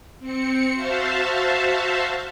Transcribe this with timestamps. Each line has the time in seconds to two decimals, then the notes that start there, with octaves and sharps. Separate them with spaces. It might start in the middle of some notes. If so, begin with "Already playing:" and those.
0.20 C4 C#7
0.74 F#4 C5 E5 F5 A5